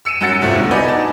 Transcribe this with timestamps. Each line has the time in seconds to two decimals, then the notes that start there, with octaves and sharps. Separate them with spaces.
0.05 E6 C#7 D#7 E7
0.21 F#2 F#3 F#5 A6 C#7
0.41 F1 C2 C3 A3 F4
0.56 B2 D3
0.71 D#4 F#4 B4 D5 D#5 G#5
0.88 A5